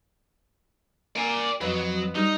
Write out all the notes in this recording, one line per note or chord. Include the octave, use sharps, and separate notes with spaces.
A#3 D5 G#5
F2 F#3 B3 D#5
G3 D#4